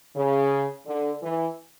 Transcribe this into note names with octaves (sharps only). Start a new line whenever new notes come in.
C#3
D3
E3